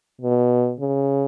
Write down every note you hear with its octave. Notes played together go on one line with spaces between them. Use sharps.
B2
C#3